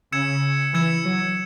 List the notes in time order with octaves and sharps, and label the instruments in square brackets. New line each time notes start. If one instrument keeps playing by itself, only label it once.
[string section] C#3 [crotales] E6 G#6 C#7 E7
[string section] E3 [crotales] E6 G#6 C#7 E7
[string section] F#3